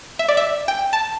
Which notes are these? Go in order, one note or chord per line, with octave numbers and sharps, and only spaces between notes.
E5
D5
E5
G5
A5